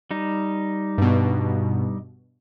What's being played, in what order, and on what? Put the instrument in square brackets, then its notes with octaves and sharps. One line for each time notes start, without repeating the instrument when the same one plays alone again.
[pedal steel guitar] G3 D#4
[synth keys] G2 B2